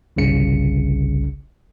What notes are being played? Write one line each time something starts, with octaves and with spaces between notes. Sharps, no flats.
G1 C2 C#3 C#7